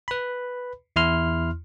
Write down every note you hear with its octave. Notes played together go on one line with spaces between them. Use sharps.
B4 B5
E2 E4 C6 F6